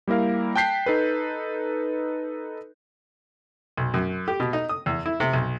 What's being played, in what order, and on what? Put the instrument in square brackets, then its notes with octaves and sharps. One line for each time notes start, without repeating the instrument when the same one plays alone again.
[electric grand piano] G3 A#3 E4 A#4 F5
G5 A5 F#6 G6 B6 C7
D#4 A4 B4
[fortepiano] B1
F#2
G4
B2
D#4
D#6
E2
E4
C3
B1